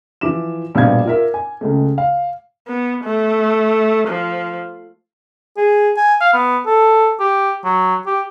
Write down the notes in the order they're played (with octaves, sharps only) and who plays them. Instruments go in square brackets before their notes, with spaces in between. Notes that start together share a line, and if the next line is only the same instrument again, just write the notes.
[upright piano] E3 F3 E5 D6 E7
A#1 G2 B2 F5 G#6
F4 A#4 E5
G#5
C#2 C#3 G#3 A3
F5
[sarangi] B3
A3
F3
[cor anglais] G#4
G#5
F5
B3
A4
G4
F#3
G4